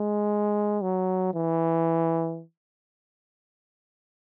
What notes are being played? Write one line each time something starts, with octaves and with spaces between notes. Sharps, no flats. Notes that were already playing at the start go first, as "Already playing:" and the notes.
Already playing: G#3
F#3
E3